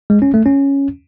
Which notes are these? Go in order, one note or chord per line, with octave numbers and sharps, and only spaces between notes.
G#3
C#4
A3
C#4